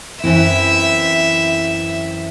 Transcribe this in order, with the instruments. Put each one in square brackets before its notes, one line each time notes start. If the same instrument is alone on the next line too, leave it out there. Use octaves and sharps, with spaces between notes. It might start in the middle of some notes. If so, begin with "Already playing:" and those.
[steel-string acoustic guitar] F#2 E3 C4 E4 [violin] E5